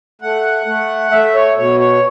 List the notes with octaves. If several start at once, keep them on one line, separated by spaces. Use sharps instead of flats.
A3 F#5
A3
A3 E5
C#5
B2 C#5
C#5